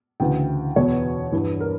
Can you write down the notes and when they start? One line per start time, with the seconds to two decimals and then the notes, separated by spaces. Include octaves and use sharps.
0.20 D2 C#3 E3 G5
0.76 E2 B2 C#5
1.32 G2 E3
1.61 A#4